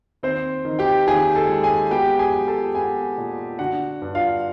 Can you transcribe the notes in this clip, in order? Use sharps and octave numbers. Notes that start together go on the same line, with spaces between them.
D#2 C4 C5
D#3
G4 G5
D#2 G#4 G#5
A4 A5
G#3
G#4 G#5
B3 G4 G5
G#4 G#5
F#3
A4 A5
B3 G#4 G#5
A#2
D3 F#4 F#5
G2
F4 F5